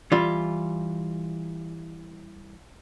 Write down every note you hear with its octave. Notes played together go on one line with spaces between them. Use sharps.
E3 G3 F4